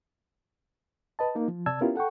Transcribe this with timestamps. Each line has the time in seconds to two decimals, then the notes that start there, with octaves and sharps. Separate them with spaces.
1.19 B4 D#5 A5
1.35 A#3 D#4
1.48 F3
1.66 C3 D5 A5 E6 G#6
1.81 B3 C#4 E4 F4 G4 A#4
1.96 A4 F#5 G5 C#6